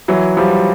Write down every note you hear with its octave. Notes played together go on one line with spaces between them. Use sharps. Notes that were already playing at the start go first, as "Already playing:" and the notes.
E3 F#3
F3 G3